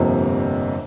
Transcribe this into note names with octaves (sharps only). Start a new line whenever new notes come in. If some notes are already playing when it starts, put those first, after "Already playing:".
Already playing: G1 F2 C3 F3 A#3